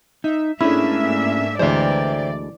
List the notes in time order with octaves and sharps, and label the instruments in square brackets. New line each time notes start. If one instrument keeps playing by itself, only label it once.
[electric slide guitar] D#4 [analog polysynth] E5
[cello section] G#2 A#3 E5 [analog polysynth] A3 D4 G#4 [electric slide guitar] C#4 [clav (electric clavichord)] E4
[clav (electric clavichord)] D2 G#3 [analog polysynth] D3 E3 [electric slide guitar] C5 E5 [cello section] D5